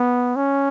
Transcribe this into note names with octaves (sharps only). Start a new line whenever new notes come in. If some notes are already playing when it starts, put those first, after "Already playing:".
Already playing: B3
C#4